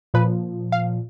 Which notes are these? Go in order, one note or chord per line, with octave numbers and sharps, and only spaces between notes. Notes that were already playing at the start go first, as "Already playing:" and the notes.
A#2 F3 B4
F5